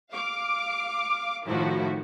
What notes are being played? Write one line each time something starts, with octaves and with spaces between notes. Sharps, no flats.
F5 D6
A2 D#3 F3 E4 F#4